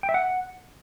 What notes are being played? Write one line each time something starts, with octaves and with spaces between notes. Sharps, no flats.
G5
E5
F#5